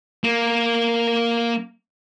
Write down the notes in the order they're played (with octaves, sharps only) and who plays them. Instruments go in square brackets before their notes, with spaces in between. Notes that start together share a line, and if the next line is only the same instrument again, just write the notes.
[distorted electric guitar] A#3